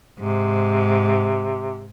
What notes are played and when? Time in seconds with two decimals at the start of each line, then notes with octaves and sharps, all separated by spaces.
0.19 G#2 C3